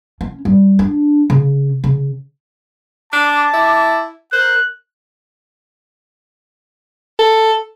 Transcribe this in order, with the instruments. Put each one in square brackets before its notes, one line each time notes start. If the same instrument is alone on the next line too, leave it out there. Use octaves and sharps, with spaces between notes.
[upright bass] C#4
G3
D4
C#3
C#3
[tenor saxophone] D4 [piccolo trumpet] A5 [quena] D6
[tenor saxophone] E4
[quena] A#4 [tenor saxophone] C5 [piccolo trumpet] F#6
[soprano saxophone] A4